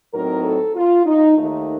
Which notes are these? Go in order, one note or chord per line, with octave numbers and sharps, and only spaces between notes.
A2 F#3 C4 D#4 A#4
A4
F4
D#4
D#2 D#3 A3 D#4